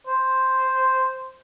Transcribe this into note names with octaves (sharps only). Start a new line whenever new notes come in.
C5